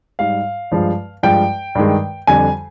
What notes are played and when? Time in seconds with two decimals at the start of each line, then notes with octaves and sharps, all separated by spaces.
0.19 G#2 G3 F5
0.71 G2 F3 G#3
1.23 G2 F3 G#3 G5
1.75 G2 D#3 G#3
2.27 F2 D3 G3 G#5